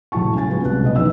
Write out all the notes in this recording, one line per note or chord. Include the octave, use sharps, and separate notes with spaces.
D#1 A2 F#3 E4 A5 C#6
C#3 G#5 A6
F#3 G#3 B3 C#4 F4 B4
C2 F#6
B1 B2 B4 D#5
F#1 D#3 E3 E4 D#5 E6